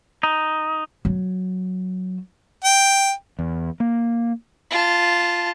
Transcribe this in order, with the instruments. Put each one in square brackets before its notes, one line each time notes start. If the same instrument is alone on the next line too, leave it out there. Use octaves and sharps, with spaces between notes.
[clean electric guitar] D#4
[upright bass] F#3
[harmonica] G5
[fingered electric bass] E2
A#3
[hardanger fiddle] F4 A5